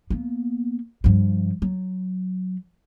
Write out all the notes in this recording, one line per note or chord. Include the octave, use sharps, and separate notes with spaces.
A#3 B3
G2 F3
F#3